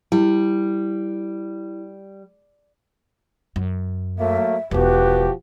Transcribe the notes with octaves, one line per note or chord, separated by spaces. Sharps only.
G3 E4
F#2
F#3 A3 A#3 E5
E1 F3 B3 F#4 G4 B4